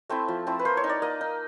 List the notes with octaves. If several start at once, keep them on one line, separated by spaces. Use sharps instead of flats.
A3 C4 E4
F3
A3 C4 E4
B4
A#3 C5
C#5
D#4
D5
A#3 D#5
D#4